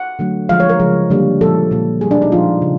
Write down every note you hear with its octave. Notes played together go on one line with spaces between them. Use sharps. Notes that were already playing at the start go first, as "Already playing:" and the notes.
Already playing: F#5
D3 F#3 A3
D3 F3 G#3 F5
C#5
A#4
C#3 F3 G#3
D3 G3 A#3
A#2 F3 G#3 A4
A#2 G3 A#3
B2 G3 A#3 G#4
D4
D#4
A#2 F3 G#3 F4
C#3